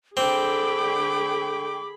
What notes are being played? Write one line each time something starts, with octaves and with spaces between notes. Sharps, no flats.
D3 C4 G#4 G5 B5 D6